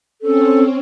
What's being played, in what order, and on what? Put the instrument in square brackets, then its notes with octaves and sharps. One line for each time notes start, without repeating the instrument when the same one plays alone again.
[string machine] C4 C#4 [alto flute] A4